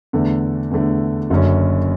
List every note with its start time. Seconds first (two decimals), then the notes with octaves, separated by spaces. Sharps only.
0.13 E2 D3 A3
0.71 E2 D3 A3
1.30 F#1 F#2 D3 F#3 C#4